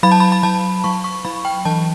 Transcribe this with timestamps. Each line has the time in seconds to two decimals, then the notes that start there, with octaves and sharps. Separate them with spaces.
0.03 F#3 B5
0.12 A5
0.20 B5
0.32 B5
0.43 F#3 A5
0.84 F#3 C#6
1.04 C#6
1.25 F#3 B5
1.45 G5
1.65 E3 A5